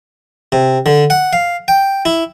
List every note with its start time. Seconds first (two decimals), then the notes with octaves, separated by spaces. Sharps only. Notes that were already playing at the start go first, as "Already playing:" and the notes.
0.52 C3
0.86 D3
1.10 F#5
1.33 F5
1.68 G5
2.05 E4